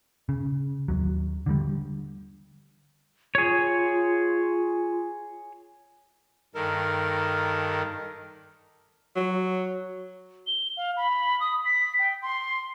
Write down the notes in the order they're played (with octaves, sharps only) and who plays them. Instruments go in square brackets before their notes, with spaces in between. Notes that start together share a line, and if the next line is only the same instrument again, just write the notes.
[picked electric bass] C#3
D#2 F#3
D3 E3 G3
[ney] F4 [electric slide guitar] G#4 C#5
[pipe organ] G2 D#3 A4 [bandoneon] A#4
[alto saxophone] F#3
[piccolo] G7
F5
B5
D#6
B6
G5
C6